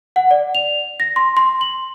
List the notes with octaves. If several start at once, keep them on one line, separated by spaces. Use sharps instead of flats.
F#5
D5
F7
A#6
C6
C6
F#7